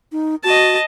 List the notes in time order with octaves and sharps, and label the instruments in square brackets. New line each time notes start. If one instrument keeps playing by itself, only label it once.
[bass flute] D#4
[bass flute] F#4 [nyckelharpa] D#5 A5